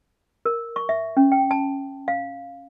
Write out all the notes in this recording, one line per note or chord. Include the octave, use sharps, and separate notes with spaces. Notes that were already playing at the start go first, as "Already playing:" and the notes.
A#4
C#6
E5
C#4
G5
A5
F5